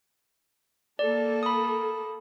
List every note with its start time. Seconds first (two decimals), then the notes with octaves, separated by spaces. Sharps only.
0.99 A#3 A4 D5
1.43 B5 D#6